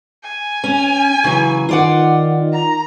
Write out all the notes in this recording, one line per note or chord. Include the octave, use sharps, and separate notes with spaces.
G#5
C#4
C#3 E3 F#3
D#3 F4 D5 F#5
A#5